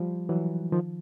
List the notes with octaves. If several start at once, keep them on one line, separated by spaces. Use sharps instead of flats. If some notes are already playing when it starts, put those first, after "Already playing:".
Already playing: F3 G3
E3 F#3
D#3 F3